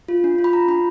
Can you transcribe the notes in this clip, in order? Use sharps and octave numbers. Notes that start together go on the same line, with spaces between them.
F4
D4
F4
B5
F4 A#5
D4 B5